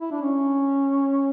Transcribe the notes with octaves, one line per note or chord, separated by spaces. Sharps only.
E4
D4
C#4